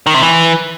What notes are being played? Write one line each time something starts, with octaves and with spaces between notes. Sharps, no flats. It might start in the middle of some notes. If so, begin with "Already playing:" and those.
D#3
C3
E3